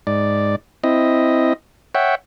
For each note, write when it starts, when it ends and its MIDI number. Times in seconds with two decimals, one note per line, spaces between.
0.07 0.56 44
0.07 0.56 74
0.84 1.53 60
0.84 1.53 64
0.84 1.53 75
1.95 2.15 73
1.95 2.15 76
1.95 2.15 78
1.95 2.15 79